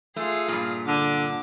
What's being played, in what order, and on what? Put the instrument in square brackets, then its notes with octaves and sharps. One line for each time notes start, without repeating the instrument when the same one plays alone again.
[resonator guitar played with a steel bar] A3 [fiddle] F4 G#4
[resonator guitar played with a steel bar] G2 A#2
[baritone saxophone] D3 [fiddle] D6